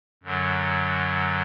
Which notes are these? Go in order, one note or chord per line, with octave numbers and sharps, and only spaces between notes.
F#2 D3 F#3